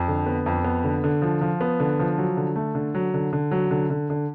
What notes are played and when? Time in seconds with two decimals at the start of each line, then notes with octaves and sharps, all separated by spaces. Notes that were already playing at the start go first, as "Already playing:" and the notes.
Already playing: F2
0.08 D3
0.26 B3
0.46 F2
0.64 B3
0.84 D3
1.04 D3
1.22 F3
1.41 F3
1.61 B3
1.80 D3
1.99 F3
2.18 F#3
2.37 D3
2.56 A3
2.75 D3
2.94 F#3
3.14 D3
3.33 D3
3.51 F#3
3.71 D3
3.90 D3
4.10 D3